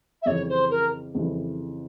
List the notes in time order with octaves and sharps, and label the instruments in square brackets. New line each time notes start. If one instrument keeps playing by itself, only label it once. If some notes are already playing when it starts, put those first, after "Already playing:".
[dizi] E5
[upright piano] F2 C#3 E3 G3 [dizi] C#5
[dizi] C5
A#4
[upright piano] F2 C#3 E3 G3